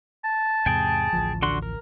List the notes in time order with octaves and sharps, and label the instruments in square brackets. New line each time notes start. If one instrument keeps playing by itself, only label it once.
[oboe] A5
[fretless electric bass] E2 G#2 C3 [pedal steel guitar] G#4 G5 G#5
[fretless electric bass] A1 D2 F3
[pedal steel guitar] D3 F#4 C6
A#4